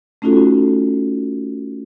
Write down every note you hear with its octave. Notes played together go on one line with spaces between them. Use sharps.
A3 C#4 D#4 F4 F#4 A4